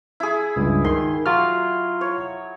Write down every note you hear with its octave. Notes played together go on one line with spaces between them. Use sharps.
E4 G#4
C#2 G2
D#3 C6
F#3 F4 F6
C#5